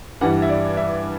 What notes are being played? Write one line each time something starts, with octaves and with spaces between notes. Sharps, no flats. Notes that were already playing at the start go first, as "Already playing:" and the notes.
G2 E3 G3 F#5
E5
D5
E5